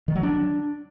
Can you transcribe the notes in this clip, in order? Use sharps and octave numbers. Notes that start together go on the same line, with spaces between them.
D#3
F#3
D4